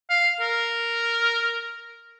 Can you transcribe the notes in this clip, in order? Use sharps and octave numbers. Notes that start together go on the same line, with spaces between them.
F5
A#4